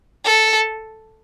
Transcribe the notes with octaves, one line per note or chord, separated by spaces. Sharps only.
A4